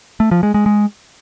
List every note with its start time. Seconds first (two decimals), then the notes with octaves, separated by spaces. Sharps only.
0.20 A3
0.31 F3
0.43 G#3
0.54 G#3
0.66 G#3